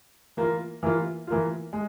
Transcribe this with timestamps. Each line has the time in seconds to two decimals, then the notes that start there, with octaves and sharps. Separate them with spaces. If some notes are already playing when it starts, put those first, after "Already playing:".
0.37 E3 A#3 F4
0.83 E3 A#3 F4
1.27 E3 A#3 F4
1.73 G#3